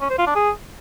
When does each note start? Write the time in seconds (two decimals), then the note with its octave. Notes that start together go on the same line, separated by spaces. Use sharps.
0.01 C#4
0.10 C5
0.18 F4
0.27 D4
0.35 G#4